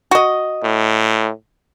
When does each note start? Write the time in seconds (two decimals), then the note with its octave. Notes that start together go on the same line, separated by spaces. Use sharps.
0.11 F#4 D#5
0.63 A2